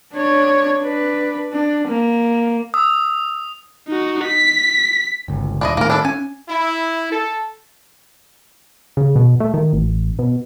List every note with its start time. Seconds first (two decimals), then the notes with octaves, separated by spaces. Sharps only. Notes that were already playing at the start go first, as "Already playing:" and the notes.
0.13 D4 C#5
0.79 D4 B4
1.52 D4
1.88 A#3
2.74 D#6 E6
3.88 D#4 F#4
4.26 B6
5.28 G1 C#2
5.61 D#1 D4 E4 D#5
5.77 A2 D#3 A#3 A#4
5.90 D4 E4 A4
6.05 C#4 G#5
6.48 E4
7.12 A4
8.97 C#3
9.16 B2
9.40 A3
9.54 D#3
9.73 A1
10.19 B2